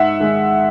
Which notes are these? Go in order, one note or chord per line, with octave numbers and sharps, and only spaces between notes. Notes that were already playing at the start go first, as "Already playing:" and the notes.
Already playing: G#2 E5 F#5
D#3 G#3